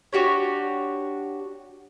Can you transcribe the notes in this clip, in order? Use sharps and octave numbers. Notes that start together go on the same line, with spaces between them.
D4 F#4 G4 C#5